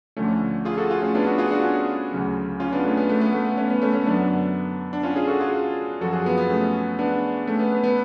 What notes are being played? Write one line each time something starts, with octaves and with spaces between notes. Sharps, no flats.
D2 D3 F3 A3 C#4
F4 G#4
F#4 A4
F4 G#4
A3 C#4
B3 D4
D4 F#4
F4 G#4
D4 F#4
C#4 F4
D2 C#3 F#3
C#4 F4
B3 D4
A3 C#4
B3
A3
B3
A3
B3
A3 C#4
B3
A3 C#4
A3 C#4
F#2 D3 F#3 B3 D4
D4
C#4 F4
F4 G#4
F#4 A4
F4 G#4
F#2 F3 F#4 A4
F4 G#4
B3
B3
A3 C#4
B3 D4
A3 C#4
B3
B3
B3